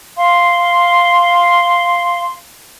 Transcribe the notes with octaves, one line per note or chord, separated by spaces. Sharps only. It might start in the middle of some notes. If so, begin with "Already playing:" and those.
F5 C6